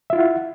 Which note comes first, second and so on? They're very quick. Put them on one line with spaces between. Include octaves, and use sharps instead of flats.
E5 F4 E4 F#5